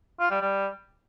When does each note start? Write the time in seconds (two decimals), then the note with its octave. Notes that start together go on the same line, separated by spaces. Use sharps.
0.20 F4
0.30 G3
0.41 G3